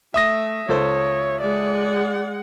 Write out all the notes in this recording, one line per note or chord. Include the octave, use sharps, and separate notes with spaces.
A3 E5 D#6 A#6
C#2 A4 C5 C#5
G#3 D5 F#5